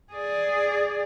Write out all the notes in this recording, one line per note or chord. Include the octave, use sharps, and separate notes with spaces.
G#4 D5